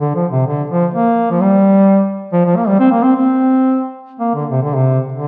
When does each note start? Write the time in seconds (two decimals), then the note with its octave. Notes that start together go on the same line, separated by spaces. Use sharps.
0.01 D3
0.16 F3
0.32 C3
0.47 D3
0.70 F3
0.94 A#3
1.31 F3
1.40 G3
2.33 F3
2.45 F3
2.57 A#3
2.68 G3
2.80 C4
2.91 A#3
3.03 C4
3.15 C4
4.20 A#3
4.35 D3
4.51 C3
4.63 D3
4.75 C3
5.12 D3